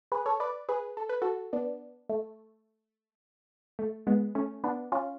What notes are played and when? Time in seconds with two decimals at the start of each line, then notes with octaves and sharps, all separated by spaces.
0.12 G#4 B4
0.26 A4 C#5
0.40 B4 D5
0.69 G#4 B4
0.97 A4
1.09 B4
1.22 F#4 A4
1.53 B3 D4
2.09 A3
3.79 A3
4.07 G#3 B3
4.35 A3 C#4
4.64 B3 D4
4.92 C#4 F4